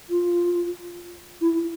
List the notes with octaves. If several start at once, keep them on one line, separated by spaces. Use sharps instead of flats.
F4
E4